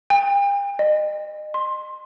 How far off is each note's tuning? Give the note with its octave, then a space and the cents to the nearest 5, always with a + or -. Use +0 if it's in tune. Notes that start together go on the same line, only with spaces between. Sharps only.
G5 +45
D#5 -35
C6 +15